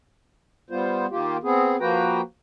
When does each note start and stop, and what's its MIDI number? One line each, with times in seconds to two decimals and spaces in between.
0.70 1.06 55
0.70 1.06 59
0.70 1.06 65
0.70 1.06 72
1.11 1.37 51
1.11 1.37 58
1.11 1.37 65
1.11 1.37 67
1.43 1.76 59
1.43 1.76 60
1.43 1.76 68
1.80 2.21 53
1.80 2.21 58
1.80 2.21 66
1.80 2.21 71
1.80 2.21 79
1.80 2.21 82